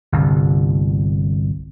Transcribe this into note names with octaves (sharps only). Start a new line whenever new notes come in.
G1 C2